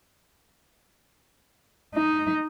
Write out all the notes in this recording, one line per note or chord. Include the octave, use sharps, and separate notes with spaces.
D#4